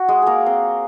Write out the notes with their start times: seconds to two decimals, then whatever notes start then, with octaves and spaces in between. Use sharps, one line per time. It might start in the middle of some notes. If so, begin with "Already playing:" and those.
Already playing: F#4
0.08 G#3 G#4
0.22 A#3 G#4 A#4
0.46 C4 C5